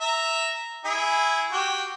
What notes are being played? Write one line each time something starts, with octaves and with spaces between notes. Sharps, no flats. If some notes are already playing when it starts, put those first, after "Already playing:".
E5 A#5
E4 G#4
F#4 G4